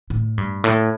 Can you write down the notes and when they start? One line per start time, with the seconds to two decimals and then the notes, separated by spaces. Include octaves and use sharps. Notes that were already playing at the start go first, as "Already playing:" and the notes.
0.10 A2
0.38 G2
0.64 A2